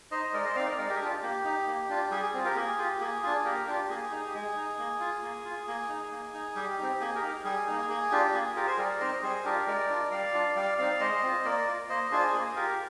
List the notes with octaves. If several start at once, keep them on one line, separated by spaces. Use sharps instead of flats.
D#4 C5 D#5
G#3 A#4 D5
C5 D#5
C4 D#4 D5 F5
A#4 D5
G#3 A#4 D5
G4 A#4
G#4
D4 F4 G4
A#3 G4
D#4
A#3
D4 F4
G3 G#4
G#4
C4 F4
G4 A#4
A#3 G#4
F4 G4
A#3 G#4
D4 F4 G#4
A#3 G4 A#4
D4 F4 G4
A#3 G#4
D#4
G4
G#3 G#4
D#4
A#3
F4
A#3
F4
A#3 G#4
D#4
A#3
D#4
G3 G4
C4 D#4
A#3 G#4
G4 A#4
D#4
G3 G#4
A#3 D#4
A#3 G#4
D4 F4 G4
A#3 G#4
G#4
F4 G4 A#4
G#4 C5
G3 A#4 D5
C4 D#4 C5 D#5
G3 G#4 C5
D4 F4 G4 A#4
G#3 A#4 D5
D4 F4
G3 D5 F5
D4 F4
G3 D5 F5
C4 D#4 D5 F5
G#3 C5 D#5
C4 F4
A#3 A#4 D5
F4
A#3 C5 D#5
D4 F4 G#4 C5
A#3 G#4
F4 G4 A#4